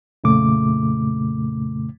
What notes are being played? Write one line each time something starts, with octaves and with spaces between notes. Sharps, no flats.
F2 A#2 C#3 A3 D6